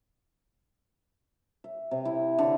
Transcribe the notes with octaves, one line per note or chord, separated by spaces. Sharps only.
E5
C3
E4
D3